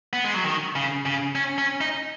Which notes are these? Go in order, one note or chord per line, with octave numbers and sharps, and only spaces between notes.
B3
G#3
F#3
D#3
C#3
C#3
C#4
C#4
D#4